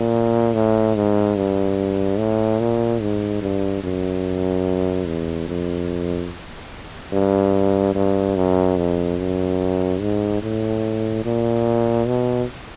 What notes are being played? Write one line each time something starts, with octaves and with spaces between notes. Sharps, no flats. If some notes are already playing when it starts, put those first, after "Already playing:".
Already playing: A#2
A2
G#2
G2
A2
A#2
G#2
G2
F#2
E2
F2
G2
G2
F#2
F2
F#2
G#2
A2
A#2
B2